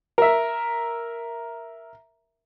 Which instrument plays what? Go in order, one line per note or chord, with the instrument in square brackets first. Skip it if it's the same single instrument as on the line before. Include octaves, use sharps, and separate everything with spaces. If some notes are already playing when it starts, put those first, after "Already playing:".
[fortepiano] A#4 E5